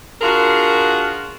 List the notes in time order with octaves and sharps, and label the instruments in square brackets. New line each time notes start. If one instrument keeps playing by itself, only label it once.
[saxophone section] D4 F4 F#4 G#4 A#4